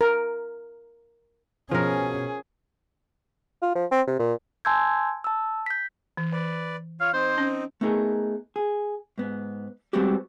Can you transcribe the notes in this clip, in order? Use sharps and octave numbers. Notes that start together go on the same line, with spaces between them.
A#4
B2 F3 C#4 G#4 A#4
F4
F3
C4
C3
A#2
G#5 A5 C6 E6 G6 G#6
A5 E6
G6 B6
E3
E3 B4 D5
F4 C#5 F5
C4 D#4 C5
C#4
A3 B3 D#4 G#4 A#4
G#4
G#2 B3
G3 G#3 B3 C4 F#4 G4